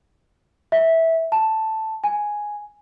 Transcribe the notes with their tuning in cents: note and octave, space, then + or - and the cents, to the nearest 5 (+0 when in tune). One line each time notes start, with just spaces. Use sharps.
E5 -15
A5 +0
G#5 +0